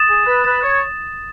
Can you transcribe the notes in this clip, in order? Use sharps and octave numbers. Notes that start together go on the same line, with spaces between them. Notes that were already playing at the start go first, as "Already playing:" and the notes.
Already playing: D#6 A6 E7
G#4
B4
B4 D#6 A6 E7
C#5